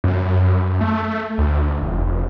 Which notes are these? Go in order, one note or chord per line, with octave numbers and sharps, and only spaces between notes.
F#2
A3
D2
F1